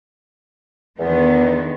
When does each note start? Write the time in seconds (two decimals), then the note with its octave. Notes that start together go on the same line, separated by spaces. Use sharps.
0.99 E2 D3 D#3 B3